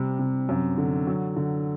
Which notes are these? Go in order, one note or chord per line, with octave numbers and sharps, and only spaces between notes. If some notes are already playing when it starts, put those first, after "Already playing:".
Already playing: C3 G3
C3
F#2
D3
F#3
D3